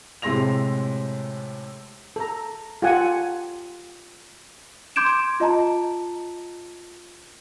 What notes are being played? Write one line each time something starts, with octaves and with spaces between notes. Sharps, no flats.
A2 C3 G#3 C6 A#6 F7
A4 A#5
F4 G4 A4 F#5 G#5
C6 D6 G6 G#6 D7 E7
F4 D#5 A5 A#5